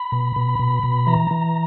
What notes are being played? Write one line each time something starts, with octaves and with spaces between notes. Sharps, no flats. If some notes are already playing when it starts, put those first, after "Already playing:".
Already playing: B5
B2
B2
B2
B2
E3 A#5
E3